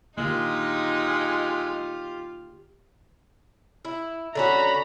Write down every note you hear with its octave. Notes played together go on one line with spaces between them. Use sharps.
D3 D#3 G#3 A#3 D#4 F4 G4
E4
D3 C#4 F#4 A#5 B5